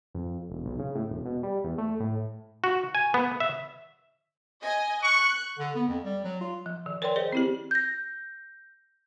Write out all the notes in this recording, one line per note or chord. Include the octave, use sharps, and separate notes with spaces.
F2
E1
B1
C#3
A2
E1
B2
G3
E2
A3
A2
F#4
G#5
B3
E5
D#5 G#5
C#6 F#6
D3
B3
F2
G3
F#3
F4
F3
D#3
A#4 B4 C#5 D5 G5 C6
G#4 B4 C5 D#5
C4 E4 G4
G6 A#6